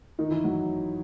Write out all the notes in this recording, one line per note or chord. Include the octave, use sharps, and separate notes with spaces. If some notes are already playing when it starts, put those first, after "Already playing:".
D#3 D#4
E3 E4
F#3 F#4